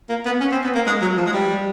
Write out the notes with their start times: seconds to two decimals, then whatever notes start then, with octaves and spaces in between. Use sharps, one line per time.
0.09 A#3
0.25 B3
0.40 C#4
0.52 C4
0.64 B3
0.75 A#3
0.86 G#3
1.02 F#3
1.17 F3
1.26 G#3
1.33 G3